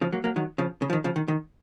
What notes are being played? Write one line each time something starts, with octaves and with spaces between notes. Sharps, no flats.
C#3 F3
F#3 A#3
F#3 A#3
D#3 F#3
C#3 F3
C#3
F3
D#3
C#3 F3
D#3
D#3